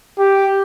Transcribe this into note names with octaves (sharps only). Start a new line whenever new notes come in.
G4